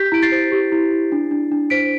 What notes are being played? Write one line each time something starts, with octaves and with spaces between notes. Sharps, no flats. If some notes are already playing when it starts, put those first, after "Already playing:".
Already playing: G4 G6 B6
E4 D7
A6 C7
C5
G4
E4
E4
D4
D4
D4
C5 B6 D7